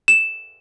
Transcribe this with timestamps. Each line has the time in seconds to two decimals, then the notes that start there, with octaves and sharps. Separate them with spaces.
0.08 E7